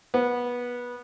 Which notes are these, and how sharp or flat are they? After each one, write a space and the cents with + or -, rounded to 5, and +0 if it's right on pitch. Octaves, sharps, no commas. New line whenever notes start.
B3 -20